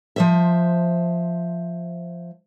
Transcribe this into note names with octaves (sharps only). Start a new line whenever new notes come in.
F3 C5 E5